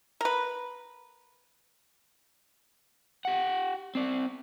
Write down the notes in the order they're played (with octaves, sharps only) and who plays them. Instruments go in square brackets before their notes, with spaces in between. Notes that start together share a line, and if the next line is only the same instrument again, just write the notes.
[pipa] A#4 B4
[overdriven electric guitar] G4 F#5
C4 D5